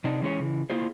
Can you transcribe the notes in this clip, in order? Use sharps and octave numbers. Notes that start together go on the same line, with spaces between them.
C3 D4 D#4
E3 G#3 C#4 D4 G#4 C#5
C#3 E3
A#3 E4 F4 G#4 C5